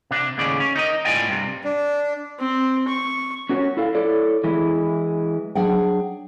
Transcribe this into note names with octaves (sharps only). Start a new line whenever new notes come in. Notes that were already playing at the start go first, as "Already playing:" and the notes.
C3 D4
D#2 A2 C#3 D5
C#4
D#4 A#4 D#5
A2 F4 D5 D#5 G5 G#5
G2 C3
D4
C4
C#6
C#4 F#4 A#4 C#5
E4 A4 F5
E4 A4 C#5 D5
E3 G#3 E4
F#3 D4 G#4 F#5 G5